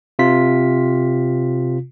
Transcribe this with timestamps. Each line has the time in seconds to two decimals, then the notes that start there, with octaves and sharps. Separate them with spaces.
0.19 C3 F4 B6